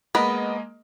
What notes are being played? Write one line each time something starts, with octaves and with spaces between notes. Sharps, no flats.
G#3 A#3 B3 A#4 D#5 B5